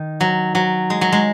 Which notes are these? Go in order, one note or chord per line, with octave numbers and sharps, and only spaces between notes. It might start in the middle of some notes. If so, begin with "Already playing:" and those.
Already playing: D#3
F#3
F#3
G#3
F#3
G#3